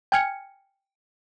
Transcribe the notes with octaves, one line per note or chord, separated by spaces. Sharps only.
G5 G#5 F6 G#6 C#7